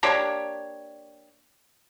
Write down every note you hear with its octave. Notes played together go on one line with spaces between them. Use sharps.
A#3 D4 G4 C#5